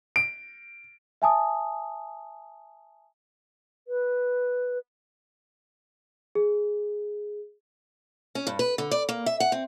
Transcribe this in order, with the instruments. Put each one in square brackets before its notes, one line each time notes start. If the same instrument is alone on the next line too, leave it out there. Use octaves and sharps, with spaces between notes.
[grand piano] D7
[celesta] E5 G#5 A5 D#6
[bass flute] B4
[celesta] G#4
[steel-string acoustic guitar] C#4
G2
B4
D3
D5
A#3
E5
F#5
C4